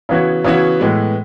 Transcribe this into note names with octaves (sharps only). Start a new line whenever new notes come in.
C#3 E3 B3 F#4 C#5
C#3 E3 B3 F#4 C#5
A2 E3 G#3 B3